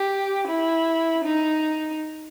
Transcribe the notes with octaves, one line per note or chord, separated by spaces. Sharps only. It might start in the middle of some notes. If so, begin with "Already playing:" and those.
Already playing: G4
E4
D#4